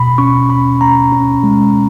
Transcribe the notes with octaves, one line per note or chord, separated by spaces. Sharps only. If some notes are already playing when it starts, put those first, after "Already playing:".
Already playing: B2 B5
C#4 C#6
C#4 B5
C#4 A#5
C#4
G#3